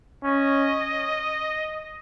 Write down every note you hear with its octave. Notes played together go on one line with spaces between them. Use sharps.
C#4 D#5